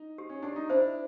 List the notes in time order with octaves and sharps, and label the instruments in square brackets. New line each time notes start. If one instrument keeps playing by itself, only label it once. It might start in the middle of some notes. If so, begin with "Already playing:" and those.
Already playing: [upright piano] D#4
[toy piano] G4
[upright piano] C#4
[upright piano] D4 [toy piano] G4
[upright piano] D#4
[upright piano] D4 E4 [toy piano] C5